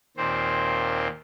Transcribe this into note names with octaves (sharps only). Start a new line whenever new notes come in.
D#2 A#2 C4 C5